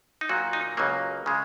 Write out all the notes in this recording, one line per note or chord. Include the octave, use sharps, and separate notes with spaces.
D#4
A#2 F#3 A#3 F#4
D#4
C#2 C#3 F#3 A#3
C#3 G#3